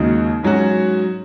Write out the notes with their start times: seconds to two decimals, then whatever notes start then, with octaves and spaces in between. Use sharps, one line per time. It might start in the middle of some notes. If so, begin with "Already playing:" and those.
Already playing: D#2 C#3 G#3 D#4 F#4
0.43 G#2 F#3 C#4 F#4